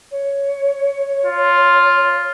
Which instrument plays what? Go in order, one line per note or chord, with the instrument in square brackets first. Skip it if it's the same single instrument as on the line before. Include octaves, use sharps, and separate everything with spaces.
[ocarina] C#5
[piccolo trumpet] F4